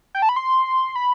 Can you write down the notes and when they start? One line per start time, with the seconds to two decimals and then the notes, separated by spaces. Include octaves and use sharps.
0.15 G5
0.22 A5
0.29 B5
0.36 C6
0.96 B5